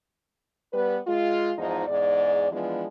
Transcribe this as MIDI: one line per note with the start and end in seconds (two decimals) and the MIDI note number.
0.72 0.97 55
0.72 0.97 59
0.72 0.97 71
1.07 1.51 56
1.07 1.51 65
1.57 1.87 40
1.57 1.87 44
1.57 1.87 53
1.57 1.87 63
1.87 2.51 40
1.87 2.51 44
1.87 2.51 74
2.51 2.85 52
2.51 2.85 53
2.51 2.85 56
2.51 2.85 59
2.51 2.85 62